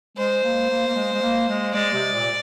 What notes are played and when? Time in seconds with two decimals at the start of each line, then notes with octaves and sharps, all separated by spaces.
0.17 G#3 C5
0.43 A#3
0.69 A#3
0.87 A#3
0.95 G#3
1.13 G#3
1.22 A#3
1.48 G#3
1.74 G#3 D5
1.94 C3
2.13 A#2